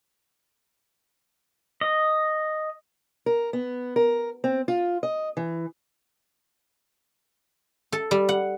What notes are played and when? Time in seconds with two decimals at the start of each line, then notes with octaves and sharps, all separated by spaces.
1.81 D#5
3.26 A#4
3.53 B3
3.96 A#4
4.44 C4
4.68 F4
5.03 D#5
5.37 E3
7.92 A4
8.11 G3
8.29 F#5